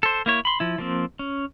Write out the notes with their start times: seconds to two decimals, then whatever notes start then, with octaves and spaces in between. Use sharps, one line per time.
0.03 A4 C5
0.26 A#3 E4 C#5
0.45 B5 C6
0.60 F3 E4
0.78 F3 A#3 C4
1.19 C#4